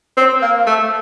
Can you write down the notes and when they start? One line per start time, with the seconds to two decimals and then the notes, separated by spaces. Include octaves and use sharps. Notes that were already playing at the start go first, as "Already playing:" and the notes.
0.17 C4
0.42 A#3
0.67 A3